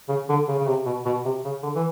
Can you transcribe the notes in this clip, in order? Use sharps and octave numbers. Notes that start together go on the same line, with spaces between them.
C#3
D3
C#3
C#3
C3
B2
B2
C3
C#3
D3
E3